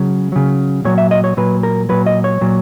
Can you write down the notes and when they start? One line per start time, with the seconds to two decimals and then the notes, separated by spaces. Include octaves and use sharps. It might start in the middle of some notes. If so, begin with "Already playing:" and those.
Already playing: C#3 F#3
0.32 C#3 F#3
0.85 A#2 F#3 C#5
0.98 E5
1.11 D#5
1.24 C#5
1.37 A#2 F#3 B4
1.63 A#4
1.89 A#2 F#3 B4
2.06 D#5
2.24 C#5
2.41 A#2 F#3